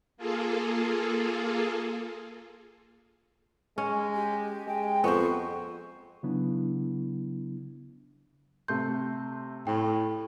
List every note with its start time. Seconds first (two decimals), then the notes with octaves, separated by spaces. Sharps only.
0.17 A#3 F4 G#4 A4
3.78 G#3 C#4
4.14 G4
4.68 G#3 G5
5.04 F2 B3 C5 C#6
6.23 C#3 F#3 B3 D4 E4
8.68 C3 A3 C6 G6
9.67 A2 G5